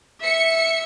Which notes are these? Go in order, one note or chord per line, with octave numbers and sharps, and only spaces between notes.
E5 C#7